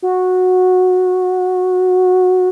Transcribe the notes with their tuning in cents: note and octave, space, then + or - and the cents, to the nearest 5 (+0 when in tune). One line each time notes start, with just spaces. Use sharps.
F#4 -10